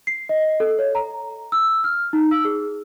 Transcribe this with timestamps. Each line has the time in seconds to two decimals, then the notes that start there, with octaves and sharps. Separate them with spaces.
0.07 C7
0.29 D#5
0.60 A4
0.79 C#5
0.95 A#5
1.52 E6
1.84 F6
2.13 D#4
2.31 E6
2.45 G#4